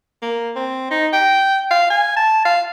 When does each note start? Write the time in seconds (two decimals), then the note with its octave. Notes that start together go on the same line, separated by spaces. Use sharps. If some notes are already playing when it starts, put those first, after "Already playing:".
0.22 A#3
0.56 C4
0.91 D#4
1.13 G5
1.71 F5
1.90 G#5
2.16 A5
2.45 F5